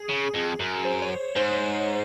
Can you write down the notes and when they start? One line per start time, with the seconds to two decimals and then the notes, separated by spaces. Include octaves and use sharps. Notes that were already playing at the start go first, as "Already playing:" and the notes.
Already playing: G#4
0.09 C#3
0.34 F2
0.60 F#2
0.85 C5
1.02 C#5
1.36 G#2 C5